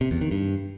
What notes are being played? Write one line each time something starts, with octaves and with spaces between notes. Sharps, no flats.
C3
E2
D#3
G2